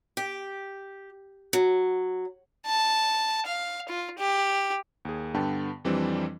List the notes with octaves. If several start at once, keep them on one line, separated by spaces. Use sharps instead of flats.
G4
F#3
A5
F5
F4
G4
D#2 G#4
G2 D3 B3 G5 A5
F2 E3 G3 C4 D4